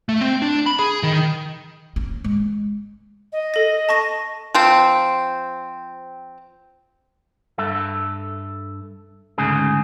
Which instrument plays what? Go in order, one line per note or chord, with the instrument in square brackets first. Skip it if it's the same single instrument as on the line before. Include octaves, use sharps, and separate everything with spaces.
[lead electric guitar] A3
C4
D4
B5
G#4
D#3
[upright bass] C#4
G#3
[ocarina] D#5
[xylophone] A4 A#6
A5 C#6 A#6
[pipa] F3 C4
[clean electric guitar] G2 A4 E5
D2 G#2 C#3 G#4